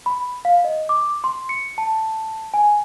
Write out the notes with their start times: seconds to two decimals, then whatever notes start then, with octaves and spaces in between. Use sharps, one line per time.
0.06 B5
0.45 F5
0.64 D#5
0.89 D6
1.24 C6
1.49 C#7
1.78 A5
2.54 G#5